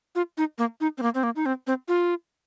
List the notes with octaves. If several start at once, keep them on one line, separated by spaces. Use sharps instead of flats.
F4
D#4
A#3
D#4
C4
A#3
C4
A#3
D#4
C4
C4
F4